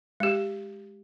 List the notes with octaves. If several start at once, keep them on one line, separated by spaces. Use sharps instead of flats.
G#3 G4